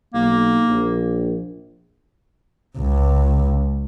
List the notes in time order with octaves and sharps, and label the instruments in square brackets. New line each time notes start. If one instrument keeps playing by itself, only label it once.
[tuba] B1 [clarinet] A#3
[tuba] A#1
[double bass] C#2